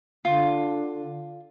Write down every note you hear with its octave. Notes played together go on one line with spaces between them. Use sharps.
D3 F4